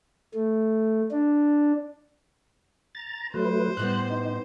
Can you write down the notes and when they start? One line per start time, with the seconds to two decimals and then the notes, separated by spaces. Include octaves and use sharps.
0.34 A3
1.11 D4
2.95 A#5 A6
3.34 F#3 A3 B4 C5
3.77 A2 G3 B3 F#6
4.10 D#4